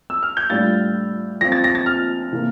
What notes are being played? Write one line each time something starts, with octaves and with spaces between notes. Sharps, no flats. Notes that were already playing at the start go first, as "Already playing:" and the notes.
E6
F6
G6
A2 G3 D4 F4 A6
F3 C4 F4 A#6
A6
A#6
A6
F6
C3 E3 A#3